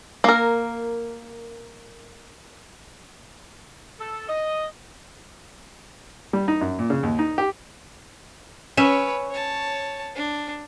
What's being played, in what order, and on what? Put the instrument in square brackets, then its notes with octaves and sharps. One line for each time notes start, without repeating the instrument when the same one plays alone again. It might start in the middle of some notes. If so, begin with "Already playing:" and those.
[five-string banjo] A#3 A#4
[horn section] A4
D#5
[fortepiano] G3
D#4
F#2
A#2
C#3
D#2
D#4
G4
[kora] C#4 E5 [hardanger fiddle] B4 C#5
[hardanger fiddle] C#5 A5
D4